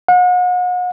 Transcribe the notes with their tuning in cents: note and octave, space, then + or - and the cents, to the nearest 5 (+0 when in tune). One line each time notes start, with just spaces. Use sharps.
F#5 -40